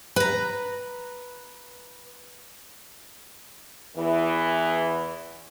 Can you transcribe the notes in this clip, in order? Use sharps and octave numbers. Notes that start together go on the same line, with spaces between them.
B4 A#5
E2 E3